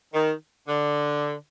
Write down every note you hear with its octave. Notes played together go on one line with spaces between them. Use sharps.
D#3
D3